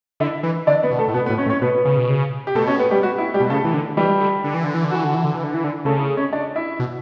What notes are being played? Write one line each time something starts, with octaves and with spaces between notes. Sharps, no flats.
D3 E4 E5
E3
D3 D4 D5
B3 B4
B2
A3 A4
A2
B2 B3 B4
B3 B4
A2
C#4 C#5
A2
C#4 C#5
B2 B3 B4
C#3
B2
C#3
G4
B2 A3 A4
C#4 C#5
B3 B4
G3 G4
F#4
E4
G3 G4
B2
C#3 A3 A4
E3
D3
E3 G3 G4
D3
D3
E3
D3
E3
D3
E3 F#4
D3
E3
D3
E3
D3
E3
D3
C#3 A3 A4
C#4 C#5
D4 D5
E4 E5
B2